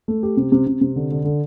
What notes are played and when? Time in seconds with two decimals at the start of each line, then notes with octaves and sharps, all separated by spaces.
0.08 A3
0.23 G4
0.37 C3
0.52 C3
0.67 C3
0.81 C3
0.96 D3
1.11 D3
1.24 D3